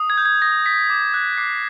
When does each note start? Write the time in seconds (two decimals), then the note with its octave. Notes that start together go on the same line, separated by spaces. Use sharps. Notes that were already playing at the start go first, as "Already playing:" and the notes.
Already playing: D#6
0.10 G#6
0.18 G6
0.25 G#6
0.42 D#6 A#6
0.66 G6 B6
0.90 D6
1.14 F#6
1.38 D6 C7